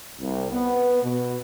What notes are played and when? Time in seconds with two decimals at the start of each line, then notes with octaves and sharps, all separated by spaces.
0.19 C2
0.51 B3
1.02 B2